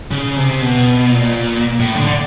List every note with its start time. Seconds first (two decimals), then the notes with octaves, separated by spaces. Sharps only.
0.11 C#3
0.36 C3
0.62 B2
1.11 A#2
1.79 A2
1.95 D3
2.07 D3